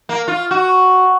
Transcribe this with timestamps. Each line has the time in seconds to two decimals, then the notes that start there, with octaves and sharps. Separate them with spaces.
0.09 A#3
0.28 F4
0.51 F#4